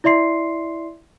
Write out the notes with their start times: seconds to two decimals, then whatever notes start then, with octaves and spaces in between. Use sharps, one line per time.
0.04 E4 D5 E5 C6 C7